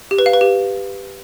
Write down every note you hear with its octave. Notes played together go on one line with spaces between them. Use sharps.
G4
B4
F5
B4
G4